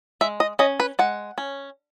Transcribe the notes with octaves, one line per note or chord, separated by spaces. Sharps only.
G#3 E5
D#5
C#4 D#5
B4
G#3 F#5
C#4